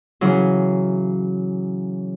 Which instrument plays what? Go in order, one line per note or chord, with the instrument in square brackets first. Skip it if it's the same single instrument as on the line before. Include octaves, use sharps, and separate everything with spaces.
[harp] C#3 E3 F#3